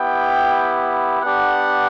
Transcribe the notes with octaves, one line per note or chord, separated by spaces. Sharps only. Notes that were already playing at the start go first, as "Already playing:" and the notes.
Already playing: B3 E4 G4 G5
B3 D4 G4 F#5